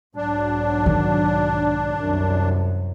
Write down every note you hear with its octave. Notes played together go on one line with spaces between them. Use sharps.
B1 G#2 F#3 D4
D#3
C2 F#2